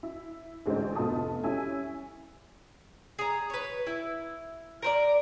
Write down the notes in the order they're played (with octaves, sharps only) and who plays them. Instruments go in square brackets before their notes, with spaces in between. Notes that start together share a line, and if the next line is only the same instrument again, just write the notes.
[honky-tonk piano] E4
A1 D2 G#3 D4 D#4 C5
F1 A3 B3 F4 A5 D#6
G3 C#4 E4 G#5
[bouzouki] G#4 A#5
B4 C#5
E4
A#4 C5 D5